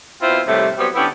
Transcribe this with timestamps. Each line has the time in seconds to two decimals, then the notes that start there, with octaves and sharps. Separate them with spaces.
0.22 B2 C4 E4 F4 C5
0.47 D#2 A2 C3 G3 A3
0.78 F#3 G3 B3 C4
0.95 D3 B3 C#4 E4 G4